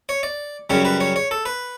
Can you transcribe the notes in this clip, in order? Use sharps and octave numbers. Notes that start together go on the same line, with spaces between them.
C#5
D5
F#2 C#3 G3 C#5
B4
C#5
C#5
A4
B4